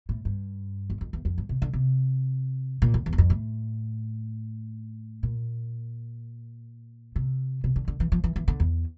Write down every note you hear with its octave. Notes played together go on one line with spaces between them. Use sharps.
A2
G2
F2
F2
E2
F2
G2
C3
D3
C3
A#2
F2
E2
G2
F2
A2
A#2
C3
C3
D3
D3
E3
F3
E3
E3
D3
E2